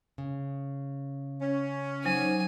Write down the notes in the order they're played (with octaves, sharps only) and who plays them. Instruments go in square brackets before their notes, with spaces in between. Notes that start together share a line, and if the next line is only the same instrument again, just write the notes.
[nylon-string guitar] C#3
[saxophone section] C#4
[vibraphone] F#3 D#4 C5 [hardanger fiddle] G#5